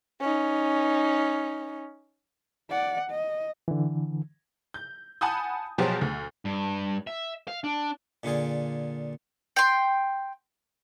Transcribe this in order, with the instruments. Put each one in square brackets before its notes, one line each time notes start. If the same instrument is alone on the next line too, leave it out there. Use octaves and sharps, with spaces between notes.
[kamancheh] C#4 D#4
[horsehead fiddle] D5 F#5
D#5
[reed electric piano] D3 E3
[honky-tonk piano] G6
F#5 G#5 A5 B5 D#6 G6
B2 F3 F#3 G4 G#4 C5
D2
[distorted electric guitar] G2
E5
F5
D4
[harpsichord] A#2 D3 F4 G#4 G5
[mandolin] G5 C6